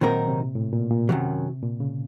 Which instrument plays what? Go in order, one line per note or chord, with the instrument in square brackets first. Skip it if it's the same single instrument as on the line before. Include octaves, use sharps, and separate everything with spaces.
[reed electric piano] A#2 [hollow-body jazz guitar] D#3 F#3 C4 D#4 A#4
[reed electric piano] C3
A2
A#2
A#2
[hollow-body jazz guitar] F#2 D#3 F#3 [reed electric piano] C3
[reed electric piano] A#2
C#3